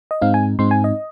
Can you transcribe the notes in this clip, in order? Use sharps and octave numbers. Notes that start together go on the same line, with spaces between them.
D#5
G#2 G#3 C4 D#4 F5
G#5
G#2 G#3 C4 D#4 C6
G#5
D#5